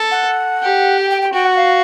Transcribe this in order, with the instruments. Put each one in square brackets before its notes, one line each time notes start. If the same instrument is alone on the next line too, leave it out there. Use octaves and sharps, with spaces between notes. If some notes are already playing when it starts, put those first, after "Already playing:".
Already playing: [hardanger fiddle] A4
[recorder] F#5
[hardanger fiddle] G4
[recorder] G5
G5
G5
[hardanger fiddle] F#4 [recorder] G5
[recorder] F#5
F5